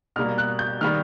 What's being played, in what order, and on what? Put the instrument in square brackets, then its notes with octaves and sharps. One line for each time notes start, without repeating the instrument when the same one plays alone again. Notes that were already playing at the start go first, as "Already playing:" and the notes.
[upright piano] B2 G3 A#3 F6
F#6
G6
D#3 G3 B3 F6